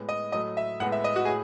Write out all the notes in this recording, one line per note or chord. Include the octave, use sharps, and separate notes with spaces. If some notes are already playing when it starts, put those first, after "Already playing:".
Already playing: A2 G#3 B3
D#5
A2 F#3 A3 D#5
E5
A2 G#3 B3 F#5
E5
D#5
F#4
A2 G#4